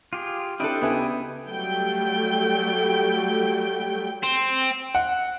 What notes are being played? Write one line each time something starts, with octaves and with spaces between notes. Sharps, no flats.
F4 G4 G#4
C4 D4 E4 G4 A4 D#5 G5
C#3 B3 E4 G#5
F#3 G3 A3 G5
C4
F#5